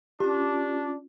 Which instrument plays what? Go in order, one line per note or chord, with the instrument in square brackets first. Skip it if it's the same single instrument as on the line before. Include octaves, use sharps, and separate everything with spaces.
[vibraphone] C#4 F4 [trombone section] D4 [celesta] G4